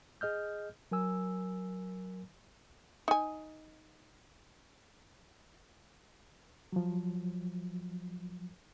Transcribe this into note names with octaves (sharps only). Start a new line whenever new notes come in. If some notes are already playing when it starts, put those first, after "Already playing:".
G#4 D#5 F6 G6
F#3 A#4 G#5 E6
D#4 G#5
F3 F#3